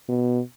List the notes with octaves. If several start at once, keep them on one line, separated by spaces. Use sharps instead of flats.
B2